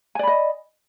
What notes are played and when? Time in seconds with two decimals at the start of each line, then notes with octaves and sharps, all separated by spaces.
0.15 G#5
0.19 D5
0.23 B5
0.27 D#5